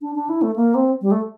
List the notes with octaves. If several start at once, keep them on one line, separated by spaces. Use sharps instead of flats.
D4
D4
E4
A3
A#3
C4
G3
A3